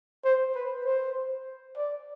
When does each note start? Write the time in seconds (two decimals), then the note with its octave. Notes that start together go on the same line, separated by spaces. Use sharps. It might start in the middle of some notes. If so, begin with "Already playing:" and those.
0.25 C5
0.55 B4
0.86 C5
1.76 D5